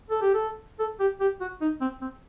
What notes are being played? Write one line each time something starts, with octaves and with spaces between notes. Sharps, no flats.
A4
G4
A4
A4
G4
G4
F#4
D#4
C4
C4